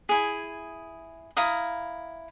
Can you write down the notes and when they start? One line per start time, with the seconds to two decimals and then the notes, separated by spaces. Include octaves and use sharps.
0.09 E4 G#4
1.37 E4 F5 A#5 D#6